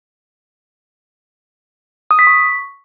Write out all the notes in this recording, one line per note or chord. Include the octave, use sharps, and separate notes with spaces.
D#6
B6
C#6